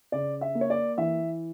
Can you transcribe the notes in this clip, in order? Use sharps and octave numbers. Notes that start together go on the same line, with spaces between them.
C#3 D5
E5
A#3
C#5
D5
E3 E5